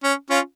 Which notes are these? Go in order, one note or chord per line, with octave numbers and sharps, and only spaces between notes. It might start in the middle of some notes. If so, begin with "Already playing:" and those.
C#4
C#4 F4